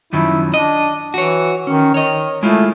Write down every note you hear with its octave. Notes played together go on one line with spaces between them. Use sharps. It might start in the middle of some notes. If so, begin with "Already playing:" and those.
F#2 D#3 F3 E4
D4 D#5
E3 F#4 C#5
D#3 C#4
D#3 C#5 D#5
G#3 A3 E4 F4